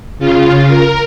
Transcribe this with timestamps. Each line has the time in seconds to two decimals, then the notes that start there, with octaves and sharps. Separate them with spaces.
0.19 C#3 F4
0.68 A#4